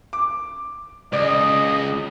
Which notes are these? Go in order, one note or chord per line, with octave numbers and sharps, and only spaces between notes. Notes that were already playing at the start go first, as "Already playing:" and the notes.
D6
C#2 D5 D#5